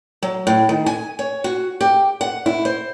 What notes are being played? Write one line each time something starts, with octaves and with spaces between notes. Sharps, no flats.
F#3
A2
D#3
G#5
C#5
F#4
G4
F#5
E4
C5